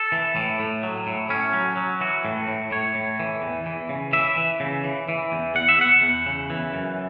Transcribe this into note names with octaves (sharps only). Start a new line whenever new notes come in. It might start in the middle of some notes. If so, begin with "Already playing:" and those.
Already playing: A4
E3
A2
A2
F#3
A2
A2 C#4
F#3
F#3
E3 F#4
A2
A2
A2 C#5
A2
E3
E2
E3
C#3
E3 E5
E3
C#3
E3
E3
E2
E2 F#5
E5
E2 F#5
E2
C#3
E3
F#2